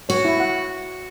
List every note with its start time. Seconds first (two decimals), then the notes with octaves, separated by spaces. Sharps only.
0.09 F#4 C#5
0.25 E4
0.40 F#5